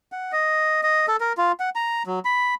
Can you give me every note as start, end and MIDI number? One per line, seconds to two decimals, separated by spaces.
0.12 0.32 78
0.32 0.81 75
0.83 1.06 75
1.08 1.16 69
1.20 1.33 70
1.38 1.52 65
1.60 1.70 78
1.75 2.03 82
2.07 2.19 54
2.25 2.54 83